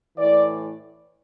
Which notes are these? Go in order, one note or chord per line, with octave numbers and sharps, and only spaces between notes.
A2 E3 D5